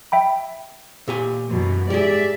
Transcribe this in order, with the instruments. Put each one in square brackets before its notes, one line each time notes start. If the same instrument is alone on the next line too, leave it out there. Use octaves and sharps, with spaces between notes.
[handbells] E5 G5 B5
[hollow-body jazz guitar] A#2 G4 G#5
[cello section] F#2 B2 E3
[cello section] G#2 D5 E5 [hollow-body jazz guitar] G4 G#4